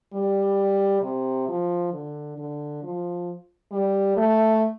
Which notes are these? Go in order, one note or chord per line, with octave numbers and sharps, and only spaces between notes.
G3
C3
F3
D3
D3
F3
G3
A3